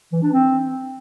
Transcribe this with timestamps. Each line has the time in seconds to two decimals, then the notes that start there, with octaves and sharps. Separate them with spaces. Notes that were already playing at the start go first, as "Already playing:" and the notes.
0.12 E3
0.23 D4
0.33 C4